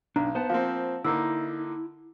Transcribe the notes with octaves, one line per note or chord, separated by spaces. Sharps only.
B1 D4 A#5
B3 C5 F#5 A5
F3 A#3 C4 F5
D3 A#3 D#4 E4 E6